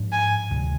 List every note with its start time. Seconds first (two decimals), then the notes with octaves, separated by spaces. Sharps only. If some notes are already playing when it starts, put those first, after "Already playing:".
Already playing: G#2 F3 G#3 D4
0.12 G#5
0.50 D2 C3 D#3 G3